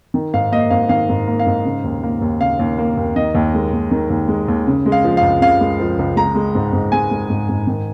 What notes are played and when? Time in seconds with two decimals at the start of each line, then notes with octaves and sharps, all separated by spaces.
0.14 D#3
0.34 G#2 F5
0.52 A#3 D#5
0.70 G#2 F5
0.89 D#3 F5
1.09 G#2
1.28 A#3
1.39 F5
1.46 G#2
1.65 C#3
1.84 D#2
2.03 A#3
2.22 D#2
2.40 C#3 F5
2.59 D#2
2.78 A#3
2.97 D#2
3.16 D#3 D#5
3.35 D#2
3.54 G#3
3.73 D#2
3.91 D#3
4.10 D#2
4.28 G#3
4.48 D#2
4.67 C#3
4.86 G#3
4.92 F5
5.04 F3
5.17 F5
5.22 C#2
5.41 C#3 F5
5.61 G#3
5.80 F3
5.99 C#2
6.16 G#3 A#5
6.35 G#3
6.55 G#2
6.73 G#2
6.92 G#3 G#5
7.11 G#3
7.30 G#2
7.49 G#2
7.67 D#3